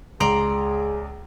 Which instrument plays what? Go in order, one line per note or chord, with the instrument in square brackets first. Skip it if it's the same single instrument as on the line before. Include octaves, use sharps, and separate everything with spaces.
[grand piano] C#2 [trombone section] G#4 [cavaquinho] D5 A#5 C6